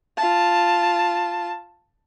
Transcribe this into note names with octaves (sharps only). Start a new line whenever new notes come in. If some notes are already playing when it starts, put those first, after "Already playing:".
F4 A5